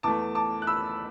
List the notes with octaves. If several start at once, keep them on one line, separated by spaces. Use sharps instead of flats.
E2 E3 A3 A5 D6
A5 D6
F#6
B5 E6